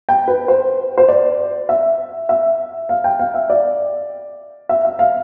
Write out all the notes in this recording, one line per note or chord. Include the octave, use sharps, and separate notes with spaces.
G5
B4
C5
C5
D5
E5
E5
F5
G5
F5
E5
D5
E5
E5
F5